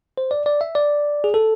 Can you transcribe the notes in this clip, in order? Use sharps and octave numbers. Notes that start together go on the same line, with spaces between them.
C5
D5
D5
E5
D5
G#4
A4